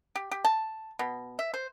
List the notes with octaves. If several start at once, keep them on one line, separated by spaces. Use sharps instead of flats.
G4
G4
A5
B2
E5
C5